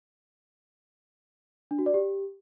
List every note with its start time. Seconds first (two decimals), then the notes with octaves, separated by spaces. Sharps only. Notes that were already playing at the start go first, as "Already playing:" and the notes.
1.71 D4
1.79 F#4
1.86 D5
1.94 G4